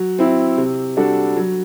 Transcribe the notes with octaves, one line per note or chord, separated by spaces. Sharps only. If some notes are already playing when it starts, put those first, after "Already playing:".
Already playing: F#3
C4 E4
C3
G3 D4 F#4 A4
F#3